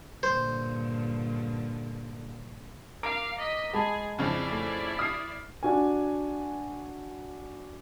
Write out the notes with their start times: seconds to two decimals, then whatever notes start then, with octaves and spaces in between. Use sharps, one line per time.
0.23 G2 A#2 D3 C5
3.03 A#4 F5 D6 D7
3.38 D#5 B6
3.73 G#3 G#4 A5 B5
4.19 F2 C#3 E4 D5
4.51 A3
4.99 D#6 F6 C7
5.63 D4 F#4 G#5